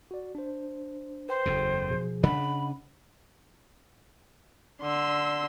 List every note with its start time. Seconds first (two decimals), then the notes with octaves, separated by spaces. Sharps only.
0.11 F#4 D5
0.35 D4 C5
1.29 B4 C5 G5
1.46 F#1 E2 C#3 A4 G5
1.89 B2 F3 G#4
2.23 C#3 D4 D#5 F#5 B5
4.82 D3 C6 E6